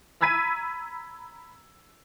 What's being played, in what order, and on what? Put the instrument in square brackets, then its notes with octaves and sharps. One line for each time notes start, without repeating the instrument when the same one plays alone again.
[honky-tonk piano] A#5 B5 E6 G#6 B6 D#7